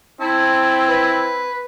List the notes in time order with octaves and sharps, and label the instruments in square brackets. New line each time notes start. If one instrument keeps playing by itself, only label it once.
[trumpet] C4 [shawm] E4 [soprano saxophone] A5
[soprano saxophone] B4